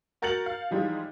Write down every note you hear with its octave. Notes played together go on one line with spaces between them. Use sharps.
F#4 A#4 G6 A6 C#7 F#7
F5
E3 F3 G3 G#3 D#4 F4